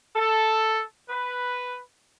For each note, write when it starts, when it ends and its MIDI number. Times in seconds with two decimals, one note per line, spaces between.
0.16 0.81 69
1.09 1.76 71